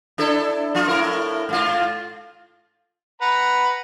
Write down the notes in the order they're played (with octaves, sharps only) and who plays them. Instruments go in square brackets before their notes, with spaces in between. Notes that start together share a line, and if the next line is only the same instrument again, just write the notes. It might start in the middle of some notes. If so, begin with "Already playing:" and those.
[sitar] D4 E4 A4
F3 D4 F4
A2 E4 A#4
G#2 F4
[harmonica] B4 F#5 A#5